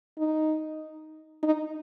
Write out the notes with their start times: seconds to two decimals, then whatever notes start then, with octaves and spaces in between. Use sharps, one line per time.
0.18 D#4
1.43 D#4